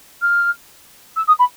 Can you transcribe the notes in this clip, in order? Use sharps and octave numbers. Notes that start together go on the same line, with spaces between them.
F6
E6
D#6
B5